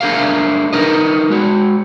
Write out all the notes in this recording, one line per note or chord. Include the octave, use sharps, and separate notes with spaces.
A3 D4 G#4 A#4 F5
D#4 E4 A#4 B4 D#5
G#3 F#4